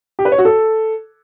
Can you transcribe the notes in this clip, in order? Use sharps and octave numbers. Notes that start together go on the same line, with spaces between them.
G4
B4
C#5
F#4
A4